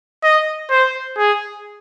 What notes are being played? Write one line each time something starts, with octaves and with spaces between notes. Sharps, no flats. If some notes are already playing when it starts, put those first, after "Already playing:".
D#5
C5
G#4